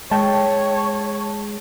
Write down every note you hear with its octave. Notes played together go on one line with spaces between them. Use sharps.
G#3 C#5 G5 A5